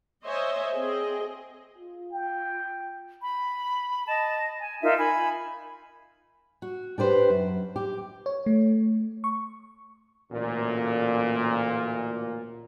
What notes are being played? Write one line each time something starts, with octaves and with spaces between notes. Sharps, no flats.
C5 C#5 D#5 E5 G#5
C4 G#4 D#5
F4
G5
B5
D#5 A5
G#5
D#4 F4 A#4 E5
G#5 B5
F#4
D4 G4 B4 C5
F#2
G4
C#5
A3
C#6
A1 D2 A#2